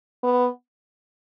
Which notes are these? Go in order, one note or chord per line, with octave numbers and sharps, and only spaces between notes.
B3